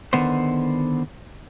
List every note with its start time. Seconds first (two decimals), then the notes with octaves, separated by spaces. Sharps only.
0.13 D3 D#3 B3 C5